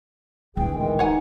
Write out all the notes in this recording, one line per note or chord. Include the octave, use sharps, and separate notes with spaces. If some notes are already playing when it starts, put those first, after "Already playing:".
D1 A#1 E3 G#4 G5
D#3 E3 G#3
D#4 C#5 F#5 G#5